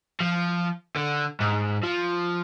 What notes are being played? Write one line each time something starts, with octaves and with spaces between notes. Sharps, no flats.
F3
D3
G#2
F3